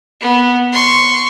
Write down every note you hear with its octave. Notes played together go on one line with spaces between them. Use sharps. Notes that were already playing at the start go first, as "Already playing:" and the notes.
B3
C6 C#6